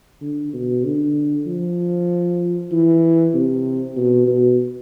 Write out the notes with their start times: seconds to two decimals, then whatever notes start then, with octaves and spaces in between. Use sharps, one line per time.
0.21 D3
0.53 B2
0.84 D3
1.47 F3
2.71 E3
3.34 C3
3.97 B2
4.28 B2